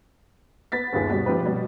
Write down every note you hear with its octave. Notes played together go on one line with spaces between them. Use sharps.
B3 A6 B6
G1 D#2 B3 F4 G#4 B6
B2 G3 B6
F3 G4 B4
B2 G3